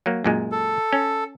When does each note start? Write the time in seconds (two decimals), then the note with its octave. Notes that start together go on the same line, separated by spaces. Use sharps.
0.06 F#3 A#3
0.24 F#2 A#2 G#3
0.52 A4
0.93 C#4